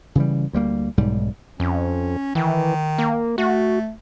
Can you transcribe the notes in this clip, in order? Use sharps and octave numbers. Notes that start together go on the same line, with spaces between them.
C#3 E3 G3
D2 G3 A#3
B1 G#2 G3
F2 C#4
D#3 E3
A#3
A3 F#4